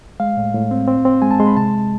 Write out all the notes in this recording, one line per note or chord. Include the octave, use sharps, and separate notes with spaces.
G#3 F5
A2
A2
C4
C4
C4
G#3 G#5
A5
G#3 C6
B5
C3 A5